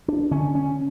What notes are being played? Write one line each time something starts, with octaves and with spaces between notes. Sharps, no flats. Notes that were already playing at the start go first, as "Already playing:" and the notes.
D4
D3 C#4
C#4